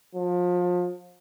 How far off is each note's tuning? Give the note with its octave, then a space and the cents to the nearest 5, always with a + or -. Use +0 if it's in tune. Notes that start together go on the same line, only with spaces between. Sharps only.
F3 +30